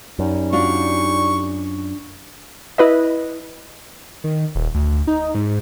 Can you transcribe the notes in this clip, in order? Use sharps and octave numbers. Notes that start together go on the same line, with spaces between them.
F#2 G3 C#4 D#4
D4 F4 F#4 C#6
E4 B4 D#5
D#3
D#1
D2
D#4
G#2